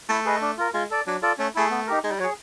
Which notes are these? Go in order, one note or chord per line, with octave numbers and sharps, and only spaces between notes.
A3 E4
G#4 B4 D#5
D4
F4 A#4
G#3 F4
A4 D5
F#3 D4
F4 A4 D5
A3 C#4
A3 E4 G#4
B3
D#4 G4 A#4
G#3 D#4
G3
F#3 G#4 C#5